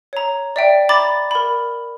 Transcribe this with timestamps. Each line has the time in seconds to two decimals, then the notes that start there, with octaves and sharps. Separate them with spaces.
0.13 C#5 A#5
0.56 D5 E5 G5
0.89 A#5 B5 D6 A6
1.31 A#4 B5